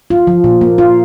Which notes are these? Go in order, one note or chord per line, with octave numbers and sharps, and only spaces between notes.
F4
F3
A#2
A#3
F4